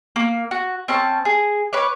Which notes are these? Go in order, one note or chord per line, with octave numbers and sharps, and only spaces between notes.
A#3
F#4
C4 C#4 A5
G#4
B4 C#5 D6